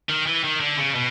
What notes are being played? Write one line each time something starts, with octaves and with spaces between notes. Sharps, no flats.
D#3
E3
D#3
D3
C#3
B2